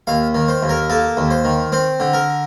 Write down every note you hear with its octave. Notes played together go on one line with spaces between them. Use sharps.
D#2 F5
D#3
C5
D#2
A#4
A#3 A4
D#2
C5
D#3
C4 C5
D3
A#4